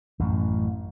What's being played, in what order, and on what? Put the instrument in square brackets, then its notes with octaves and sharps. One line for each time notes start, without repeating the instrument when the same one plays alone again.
[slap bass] A1 F#2